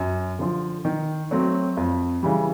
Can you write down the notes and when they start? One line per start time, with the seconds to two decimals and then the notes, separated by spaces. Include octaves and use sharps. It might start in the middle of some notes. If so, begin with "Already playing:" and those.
Already playing: F#2
0.39 D3 F3
0.85 D#3
1.31 F#3 A3 C4
1.77 F2
2.23 C#3 E3 G3